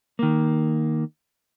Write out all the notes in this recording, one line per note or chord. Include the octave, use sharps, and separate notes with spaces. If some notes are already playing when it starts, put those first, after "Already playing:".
D#3 A#3